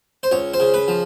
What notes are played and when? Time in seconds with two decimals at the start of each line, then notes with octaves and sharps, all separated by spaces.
0.23 C5
0.32 C#2 C#5
0.54 C5
0.60 C#3
0.74 B4
0.88 F3